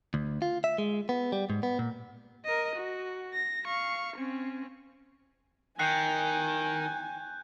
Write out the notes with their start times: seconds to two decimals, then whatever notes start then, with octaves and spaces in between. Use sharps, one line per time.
0.14 D2
0.42 F4
0.64 E5
0.78 G#3
1.09 B3
1.32 G3
1.50 G#2
1.63 B3
1.79 A#2
2.45 A#4 D#5
2.75 F#4
3.34 A#6
3.66 F5 C#6
4.17 C4 C#4
5.79 D#3 G5 G#5 F#6 G6 C7 C#7